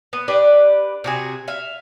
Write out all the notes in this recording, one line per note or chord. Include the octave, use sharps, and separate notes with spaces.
B3
D4 G4 B4
C3 F#4 G#4
E5 F5